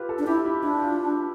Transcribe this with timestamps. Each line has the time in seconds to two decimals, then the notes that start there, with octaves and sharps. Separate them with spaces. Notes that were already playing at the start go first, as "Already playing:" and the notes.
Already playing: F4 G4 B4
0.09 A4
0.19 D4
0.27 E4 G4
0.45 E4
0.63 D4 E4
0.82 F4